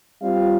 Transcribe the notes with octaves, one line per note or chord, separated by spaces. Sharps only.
G3 C4 F4 F5